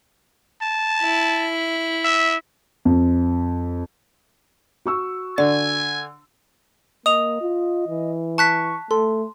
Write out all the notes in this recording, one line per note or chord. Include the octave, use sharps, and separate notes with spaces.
A5
E4
E5
F2
F#4 C#6 E6
D3 D5 G#5
A#3 D#5 D#6 F7
F4
E3
A5 C#6 F#6 B6
A3 A4 C6